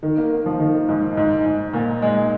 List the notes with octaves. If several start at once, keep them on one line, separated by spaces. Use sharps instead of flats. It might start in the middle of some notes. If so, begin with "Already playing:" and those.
D#3
A#3
A#3
F3
D#3
G#2
G#2
G#2
A#2
G#3